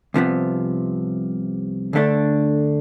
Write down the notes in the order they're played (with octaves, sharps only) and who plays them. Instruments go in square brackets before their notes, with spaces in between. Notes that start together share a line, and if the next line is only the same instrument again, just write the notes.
[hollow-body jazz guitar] C2 C3 F3 B3
D2 D3 A3 D4